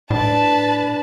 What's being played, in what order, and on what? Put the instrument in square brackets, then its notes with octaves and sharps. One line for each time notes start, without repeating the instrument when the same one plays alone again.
[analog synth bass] A2 [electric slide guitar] D4 [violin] B4 A5